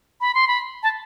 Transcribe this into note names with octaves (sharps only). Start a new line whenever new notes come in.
B5
C6
B5
A5